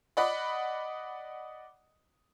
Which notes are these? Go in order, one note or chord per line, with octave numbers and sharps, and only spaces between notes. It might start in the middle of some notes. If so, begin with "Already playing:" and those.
D5 D#5 F#5 B5